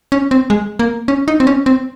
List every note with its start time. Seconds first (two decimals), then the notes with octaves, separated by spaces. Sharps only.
0.12 C#4
0.31 C4
0.50 G#3
0.79 A#3
1.08 C#4
1.28 D#4
1.40 C4
1.47 C#4
1.66 C4